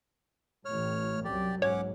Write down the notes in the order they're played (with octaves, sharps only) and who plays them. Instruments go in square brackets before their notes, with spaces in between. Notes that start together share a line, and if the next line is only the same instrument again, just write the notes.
[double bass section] A1 A2 [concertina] C#5 F6
[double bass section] C2 F#2 F#3 [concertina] G4 D5
[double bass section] B1 G#2 [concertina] C#4 F#5 D6 [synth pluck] C#5